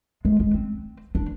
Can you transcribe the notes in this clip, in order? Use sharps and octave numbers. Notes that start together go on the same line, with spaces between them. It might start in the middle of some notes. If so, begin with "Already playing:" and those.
G#3
G#3
C4
D4